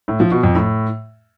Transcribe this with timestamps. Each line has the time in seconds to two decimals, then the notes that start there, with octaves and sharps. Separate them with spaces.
0.08 A2
0.20 F3
0.32 B2
0.43 F2
0.55 A2